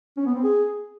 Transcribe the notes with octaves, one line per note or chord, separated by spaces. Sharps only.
C#4
B3
C4
G#4